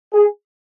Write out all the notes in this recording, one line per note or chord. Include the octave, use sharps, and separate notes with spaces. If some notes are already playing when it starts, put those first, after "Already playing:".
G#4